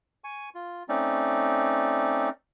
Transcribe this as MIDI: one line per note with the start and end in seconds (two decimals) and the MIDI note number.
0.24 0.49 80
0.24 0.49 85
0.55 0.83 65
0.89 2.30 57
0.89 2.30 60
0.89 2.30 61
0.89 2.30 63
0.89 2.30 74